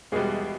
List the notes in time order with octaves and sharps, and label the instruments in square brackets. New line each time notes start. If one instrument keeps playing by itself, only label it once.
[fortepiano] E2 B2 G3 G#3 G#4